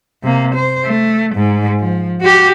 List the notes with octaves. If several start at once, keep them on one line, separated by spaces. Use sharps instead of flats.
C3 A#3
C5
A3
G#2
F3
F#4 G4